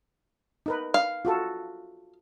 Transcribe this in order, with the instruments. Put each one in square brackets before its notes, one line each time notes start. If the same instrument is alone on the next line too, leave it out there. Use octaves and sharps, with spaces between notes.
[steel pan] D#4 A#4 B4
[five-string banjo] F5
[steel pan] F4 F#4 A4